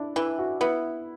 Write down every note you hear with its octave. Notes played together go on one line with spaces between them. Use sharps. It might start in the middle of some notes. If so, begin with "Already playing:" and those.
Already playing: D4 E4
E3 E4
F#4
B3 E4